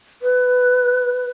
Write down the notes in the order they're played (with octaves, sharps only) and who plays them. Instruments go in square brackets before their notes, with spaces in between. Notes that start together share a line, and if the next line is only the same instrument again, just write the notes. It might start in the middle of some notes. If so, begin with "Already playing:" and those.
[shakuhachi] B4